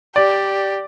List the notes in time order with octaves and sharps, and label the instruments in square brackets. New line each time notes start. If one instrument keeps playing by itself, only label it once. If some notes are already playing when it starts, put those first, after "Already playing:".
[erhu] G4 [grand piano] D5